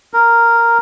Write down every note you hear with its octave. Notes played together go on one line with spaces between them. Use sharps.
A#4